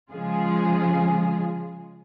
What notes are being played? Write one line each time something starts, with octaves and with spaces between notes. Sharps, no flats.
C#3 F3 G#3 F4 G#4